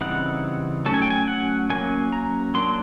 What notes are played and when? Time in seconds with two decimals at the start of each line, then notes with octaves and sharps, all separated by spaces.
0.01 C#3 E3 G3 C4 D#4 F#5
0.86 F#3 A3 C#4 A5
0.94 G#5
1.02 G5
1.10 G#5
1.28 F#5
1.70 F#3 A#3 C#4 G#5
2.12 A#5
2.54 F#3 A#3 D4 C6